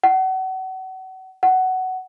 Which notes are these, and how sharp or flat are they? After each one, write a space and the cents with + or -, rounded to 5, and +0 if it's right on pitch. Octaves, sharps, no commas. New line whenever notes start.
F#5 +35
F#5 +15